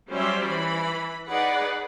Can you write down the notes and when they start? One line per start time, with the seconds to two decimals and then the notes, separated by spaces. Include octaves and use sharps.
0.10 F#3 G3 C#4 C5 D5 E5
0.46 E3 B5
1.29 D#4 G#4 B4 D5 F#5